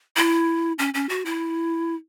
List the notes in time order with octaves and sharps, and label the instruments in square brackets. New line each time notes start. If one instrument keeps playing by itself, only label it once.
[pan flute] E4
C#4
C#4
F#4
E4